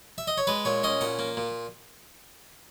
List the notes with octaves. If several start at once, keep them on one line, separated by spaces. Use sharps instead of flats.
E5
D#5
C#5
G#3 B4
A#2 C#5
C#4 D#5
A#2 F#5
A#3
A#2